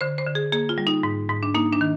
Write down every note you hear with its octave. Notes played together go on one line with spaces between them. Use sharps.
D3 C5
C5
D3
G#4
A#3 G#4
F4
G3
D#4
G#2
G#2
D4
A#3 D#4
D4
D#3